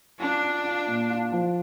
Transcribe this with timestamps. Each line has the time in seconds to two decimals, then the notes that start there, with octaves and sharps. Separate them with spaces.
0.20 D4 F4
0.43 F4
0.65 F4
0.87 A#2
1.10 F4
1.32 F3